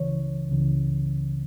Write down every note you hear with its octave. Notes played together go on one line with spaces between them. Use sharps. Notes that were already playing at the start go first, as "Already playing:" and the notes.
Already playing: C#2 C#3 E3 C#5
C#2 C#3 E3